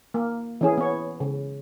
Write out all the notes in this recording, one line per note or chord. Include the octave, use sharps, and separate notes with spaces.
A#3
E3 C#4 G#4
B3 C#5
C#3